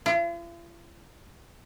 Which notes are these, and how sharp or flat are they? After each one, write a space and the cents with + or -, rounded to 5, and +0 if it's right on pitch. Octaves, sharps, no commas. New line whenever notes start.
F4 -45